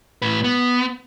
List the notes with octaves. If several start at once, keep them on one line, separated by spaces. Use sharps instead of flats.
A2 B4
B3